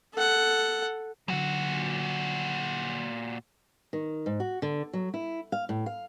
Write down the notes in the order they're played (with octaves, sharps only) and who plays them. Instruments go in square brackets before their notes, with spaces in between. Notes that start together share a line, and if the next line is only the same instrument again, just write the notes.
[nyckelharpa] A4 F#5
[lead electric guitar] A#2 F#4 [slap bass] D3 F#3
[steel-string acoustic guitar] D#3
G#2
F#4
D3
F#3
E4
F5
A2
F5